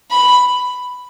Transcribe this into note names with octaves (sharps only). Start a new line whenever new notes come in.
B5